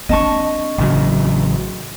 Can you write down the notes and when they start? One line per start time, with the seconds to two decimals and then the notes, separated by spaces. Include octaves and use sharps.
0.09 C4 D4 D#5 A5 C#6
0.78 A1 C#3 F#3